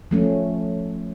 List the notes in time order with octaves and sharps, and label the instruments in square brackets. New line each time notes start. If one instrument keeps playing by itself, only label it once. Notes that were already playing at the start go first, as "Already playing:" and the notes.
[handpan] F3 A3 C#4